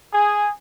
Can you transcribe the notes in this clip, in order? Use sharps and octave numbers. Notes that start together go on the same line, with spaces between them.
G#4